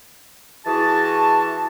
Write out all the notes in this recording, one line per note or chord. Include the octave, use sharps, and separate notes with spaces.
E3 F#4 G#4 A5